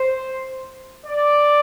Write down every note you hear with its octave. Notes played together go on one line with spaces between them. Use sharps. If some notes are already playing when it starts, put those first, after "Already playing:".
Already playing: C5
D5